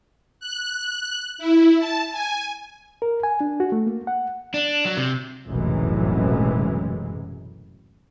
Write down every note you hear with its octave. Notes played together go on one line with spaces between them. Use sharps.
F#6
E4
A5
G#5
A#4
G#5
D4
F#4
A3
A#3
F#5
D4
F#3
C3
F1 B1 F#2 A2 E3 G#3